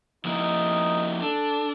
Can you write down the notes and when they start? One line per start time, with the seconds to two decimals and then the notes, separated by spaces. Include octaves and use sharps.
0.25 F3 A#3 D#4 E4
1.22 D4 A4